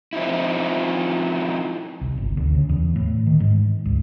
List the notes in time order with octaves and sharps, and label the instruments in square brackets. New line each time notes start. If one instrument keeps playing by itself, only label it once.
[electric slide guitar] F3 C4 D#4 E4
[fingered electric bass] C2
G1
D2
C#3
E2
A2
D#3
G#2
C#2